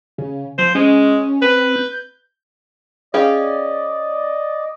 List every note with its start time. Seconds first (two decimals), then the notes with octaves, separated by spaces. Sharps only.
0.18 C#3
0.58 F3 C5
0.75 G#3 C#4
1.42 C4 B4
1.76 G6
3.14 C#4 G#4 D5 D#5 F5 G5